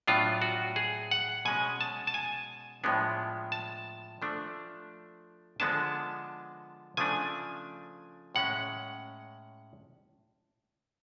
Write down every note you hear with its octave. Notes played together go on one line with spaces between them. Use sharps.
A2 F#3 B3 D4 F4
F#4
G#4
F#5
B2 G#3 C#4 G#5
A5
A5
G#5
A2 F3 G#3 B3 D4
A5
F3 A3 D4
D3 F3 G#3 B3 D4 A5
C#3 F3 A3 D4 G#5
A2 G#3 C#4 F#5